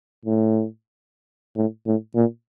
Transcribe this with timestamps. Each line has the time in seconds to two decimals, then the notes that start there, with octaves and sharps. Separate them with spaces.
0.25 A2
1.56 A2
1.86 A2
2.15 A#2